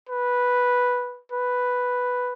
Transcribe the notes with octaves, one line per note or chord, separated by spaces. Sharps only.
B4
B4